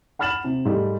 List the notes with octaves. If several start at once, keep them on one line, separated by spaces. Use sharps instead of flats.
F#5 B5 F6 A6 E7 F#7
C3
G#2 G3 A3